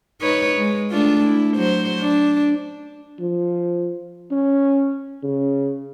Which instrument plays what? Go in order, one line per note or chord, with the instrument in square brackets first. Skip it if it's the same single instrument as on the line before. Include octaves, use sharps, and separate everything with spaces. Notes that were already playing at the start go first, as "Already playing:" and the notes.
[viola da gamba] D#4 B4 C#5
G#3
A3 D4 F4
E4
F#3 C5
D4
[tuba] F3
C#4
C#3